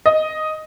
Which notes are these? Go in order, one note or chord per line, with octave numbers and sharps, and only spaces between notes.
D#5